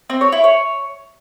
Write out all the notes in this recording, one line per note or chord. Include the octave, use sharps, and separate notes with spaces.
C4
C#5
E4
C#5